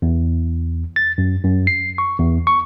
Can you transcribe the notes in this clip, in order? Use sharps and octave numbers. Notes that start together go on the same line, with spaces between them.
E2
A6
F#2
F#2
C7
C#6
E2
C#6